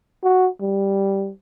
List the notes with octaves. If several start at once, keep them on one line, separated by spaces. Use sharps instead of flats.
F#4
G3